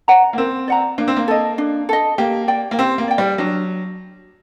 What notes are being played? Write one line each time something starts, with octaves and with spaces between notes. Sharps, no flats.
D5 F#5 A#5
A#3
C4 A#4
D5 F#5 A#5
A#3 D4
C4
A#3
A4 D#5
D4
A4 D#5
A#3 G4
D5 G5
A#3
C4 G4
A#3
D5 G5
G3
F#3 D4